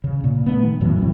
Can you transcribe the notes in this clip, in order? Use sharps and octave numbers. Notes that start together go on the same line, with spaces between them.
C#3
A#2
A3 B3
D#3
F2 A2 E3 F#3
C2 F#2 C3 A3